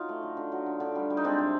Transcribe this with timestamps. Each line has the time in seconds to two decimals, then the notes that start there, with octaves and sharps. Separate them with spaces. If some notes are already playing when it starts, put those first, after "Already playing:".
Already playing: F#3 D#4 F4
0.09 A3
0.23 D3
0.37 D3
0.52 F#3
0.66 D3
0.80 D3
0.95 G3
1.10 G3
1.17 D#4
1.24 G#3 C4 D4
1.38 C3